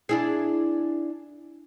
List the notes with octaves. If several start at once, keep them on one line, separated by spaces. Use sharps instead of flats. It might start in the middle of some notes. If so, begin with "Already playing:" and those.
D4 E4 G#4